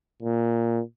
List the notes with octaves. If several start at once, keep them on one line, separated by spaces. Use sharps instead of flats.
A#2